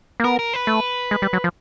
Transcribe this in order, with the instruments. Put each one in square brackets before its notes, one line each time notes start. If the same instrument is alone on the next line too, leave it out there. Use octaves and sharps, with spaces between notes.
[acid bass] A#3
[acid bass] B3 [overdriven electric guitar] A#4
[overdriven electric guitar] A#4
B4
[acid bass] A3
G#3
G3
F#3
F3